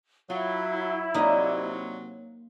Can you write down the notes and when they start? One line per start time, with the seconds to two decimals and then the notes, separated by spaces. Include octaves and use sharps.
0.30 F#3 E4 F4
1.14 C3 F#3 A#3 D#4 D5 D#5